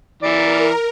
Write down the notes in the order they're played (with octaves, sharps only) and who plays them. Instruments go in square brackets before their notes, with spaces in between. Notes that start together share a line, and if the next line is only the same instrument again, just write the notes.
[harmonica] E3 D5 [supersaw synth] A#4